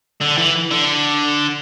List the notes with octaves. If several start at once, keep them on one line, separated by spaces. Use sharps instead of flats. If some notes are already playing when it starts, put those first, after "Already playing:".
D3
E3
D3